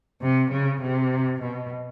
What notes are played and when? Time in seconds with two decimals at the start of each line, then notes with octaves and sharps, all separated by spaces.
0.22 C3
0.52 C#3
0.82 C3
1.42 B2